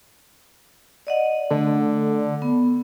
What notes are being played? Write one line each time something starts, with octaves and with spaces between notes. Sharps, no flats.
D5 D#5 F#5
D3 A3
B3